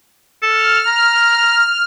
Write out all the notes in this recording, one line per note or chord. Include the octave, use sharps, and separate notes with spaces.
A4 F6
A#5